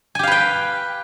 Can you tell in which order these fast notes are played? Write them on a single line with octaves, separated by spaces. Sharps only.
G#5 G4 F5 B4 G5